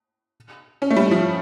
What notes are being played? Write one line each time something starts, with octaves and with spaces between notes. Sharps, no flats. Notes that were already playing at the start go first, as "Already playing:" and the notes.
C#4
A3
G3
F3